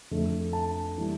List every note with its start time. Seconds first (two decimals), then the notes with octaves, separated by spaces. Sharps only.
0.11 F2 D3 A3
0.53 A5
0.98 E3 G3